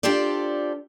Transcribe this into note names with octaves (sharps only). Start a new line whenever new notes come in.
D4 F4 G4 A4 C5 D5